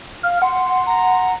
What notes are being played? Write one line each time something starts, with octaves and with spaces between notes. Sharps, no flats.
F5 F6
F#5 C6
A#5